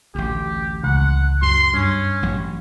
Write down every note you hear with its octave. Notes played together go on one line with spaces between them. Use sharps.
A1 D2 G4
C#2 F#5
F#2 C6
G2 C#4
A1 F#3